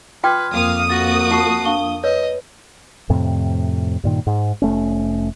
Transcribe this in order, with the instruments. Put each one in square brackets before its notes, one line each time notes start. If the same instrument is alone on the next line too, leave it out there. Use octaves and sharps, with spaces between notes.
[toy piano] F4 G5 D6 [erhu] B4 [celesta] C6 F6 G#6
[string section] F2 A#3 D#6 [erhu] F5
[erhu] F#4 [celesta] A6 A#6
[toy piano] F4 C#6 [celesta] A5 C7
[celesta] D4 F5 G7 [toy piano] A5 C#6
[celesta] B4 [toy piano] C#5 [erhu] D#5
[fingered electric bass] F2 A2 C3
G2 A#2 D#3
G#2
F1 A3 C#4